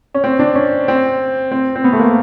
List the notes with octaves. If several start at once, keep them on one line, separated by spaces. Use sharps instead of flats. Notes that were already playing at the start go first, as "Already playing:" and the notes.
C#4
C4
D4
C#4
C4
C4
C4
B3
A3
A#3